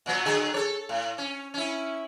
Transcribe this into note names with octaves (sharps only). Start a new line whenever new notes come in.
A#2 F#3 B3
D3 F#3 G#4
A4 C#5
A2
C#4
C#4 E4